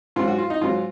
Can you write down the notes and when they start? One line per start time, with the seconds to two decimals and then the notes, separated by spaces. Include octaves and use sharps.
0.16 G#2 F4
0.20 F#3
0.28 F#4
0.38 F4
0.50 D#4
0.61 G#2 F#3 F4